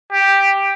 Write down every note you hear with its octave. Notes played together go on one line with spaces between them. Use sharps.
G4